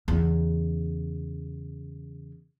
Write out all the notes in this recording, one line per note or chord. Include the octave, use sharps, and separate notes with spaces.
E2 C#3